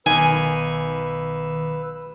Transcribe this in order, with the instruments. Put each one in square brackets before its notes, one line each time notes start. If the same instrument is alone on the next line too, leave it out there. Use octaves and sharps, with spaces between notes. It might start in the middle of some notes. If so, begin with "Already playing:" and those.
[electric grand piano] B1 [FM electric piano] D#3 [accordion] B4 E6 [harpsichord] G#5